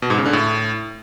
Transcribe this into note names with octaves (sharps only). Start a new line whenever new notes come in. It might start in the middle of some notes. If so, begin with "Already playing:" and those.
B2
G#2
C#3
D3
A2